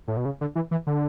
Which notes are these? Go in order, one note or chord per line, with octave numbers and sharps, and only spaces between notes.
A2
B2
C#3
D3
E3
E3
D3